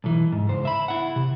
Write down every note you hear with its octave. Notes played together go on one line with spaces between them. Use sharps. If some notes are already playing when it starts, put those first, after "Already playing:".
B1 E3
G#2
C#2 C5
E5 B5
E4 F#5
C3